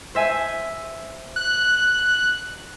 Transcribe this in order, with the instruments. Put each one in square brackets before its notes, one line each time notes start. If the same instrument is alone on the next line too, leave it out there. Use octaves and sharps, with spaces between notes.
[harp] C5 E5 G#5
[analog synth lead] F#6